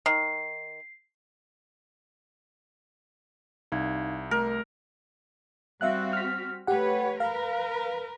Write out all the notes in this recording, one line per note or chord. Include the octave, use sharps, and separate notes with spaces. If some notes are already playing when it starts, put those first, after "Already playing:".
D#3 C7
C2 D#4 F5 G#6
A3 A#4
G3 C4 F#4 E5 F5 F#6
F6 B6
A3 G4 B4 C#5 F#5
A#4 B4 F5